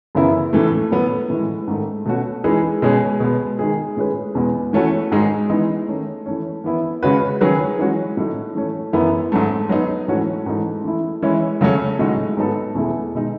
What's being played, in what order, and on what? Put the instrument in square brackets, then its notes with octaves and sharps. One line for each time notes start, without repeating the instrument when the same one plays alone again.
[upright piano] F#2 C#3 E3 B3 E4
A2 E3 A3
A2 F#3 B3
A2 E3 G#3
G#2 D#3 A3 D#4
B2 A3 C#4 F#4
E3 G#3 D#4 G#4 B4
B2 G#3 C#4 G#4
B2 G#3 B3
D#3 G#3 D#4 G#4
A2 G#3 C#4 G#4 B4
E2 B2 G#3 B3
E3 A3 C#4 F#4 A4
G#2 D#3 G#3 D#4 G#4
E3 G#3 B3 D#4
D#3 A3 C#4
E3 A3 C#4
E3 B3 E4
C#3 G#3 C#4 F#4 B4
D#3 F#3 C#4 G#4 B4
E3 G#3 C#4 F#4
A2 F#3 A3 D#4
E3 A3 C#4
F#2 E3 B3 E4
G#2 F#3 A3
F#3 B3 D#4
G#2 E3 A3 C#4 F#4
G#2 E3 A3 D#4 A4
E3 A3 E4
E3 G#3 C#4 E4
C#3 F#3 A3 C#4
A2 G#3 D#4 F#4
G#2 F#3 B3 D#4 A4
E2 B2 A3 E4 G#4
B2 G#3 D#4